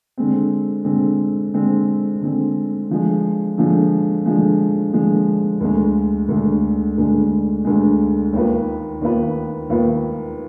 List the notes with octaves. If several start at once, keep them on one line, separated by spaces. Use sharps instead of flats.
D3 G#3 C4
D3 G#3 C4
D3 G#3 C4
D3 G#3 C4
D3 F3 G#3
D3 F3 G#3
D3 F3 G#3
D3 F3 G#3
D2 D3 G#3
D2 D3 G#3
D2 D3 G#3
D2 D3 G#3
D#2 D#3 B3 F4 B4
D#2 D#3 B3 F4 B4
D#2 D#3 B3 F4 B4